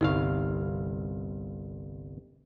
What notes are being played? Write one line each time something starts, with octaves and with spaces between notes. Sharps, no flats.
G1 C2 D#4 G4 F5